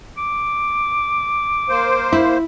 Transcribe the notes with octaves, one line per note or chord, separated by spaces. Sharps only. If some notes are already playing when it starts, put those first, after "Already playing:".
D6
A#3 C5
E4